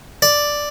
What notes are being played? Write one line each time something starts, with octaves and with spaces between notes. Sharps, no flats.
D5